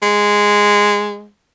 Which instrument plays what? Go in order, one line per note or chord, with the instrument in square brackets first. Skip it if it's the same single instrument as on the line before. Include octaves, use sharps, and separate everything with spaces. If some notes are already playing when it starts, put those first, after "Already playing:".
[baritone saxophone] G#3